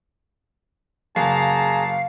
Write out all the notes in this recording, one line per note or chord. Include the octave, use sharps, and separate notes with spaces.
F#1 G#4 F5 A5 A#5